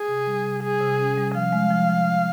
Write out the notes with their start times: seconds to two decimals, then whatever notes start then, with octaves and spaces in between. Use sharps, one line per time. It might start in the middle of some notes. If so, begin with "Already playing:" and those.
Already playing: G#4
0.08 C3
0.27 G3
0.45 C3
0.62 G3 G#4
0.81 C3
0.99 C#4
1.18 G3
1.34 F3 F5
1.52 G#3
1.71 F3
1.90 F3